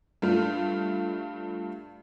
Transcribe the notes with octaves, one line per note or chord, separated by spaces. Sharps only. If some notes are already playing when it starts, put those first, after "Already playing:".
G2 A3 F4